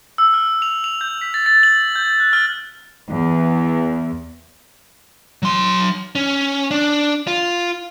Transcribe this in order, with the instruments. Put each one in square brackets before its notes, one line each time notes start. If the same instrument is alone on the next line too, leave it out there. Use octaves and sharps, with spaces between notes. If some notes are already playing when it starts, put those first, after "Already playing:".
[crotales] E6
F6
F7
F7
G6
B6
A6
A6
F#7
G6
F#6
F6
[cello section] E2
[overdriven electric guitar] F#3 C6
C#4
D4
F4